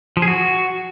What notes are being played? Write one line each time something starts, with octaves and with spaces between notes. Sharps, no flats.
F3
G#4
F#4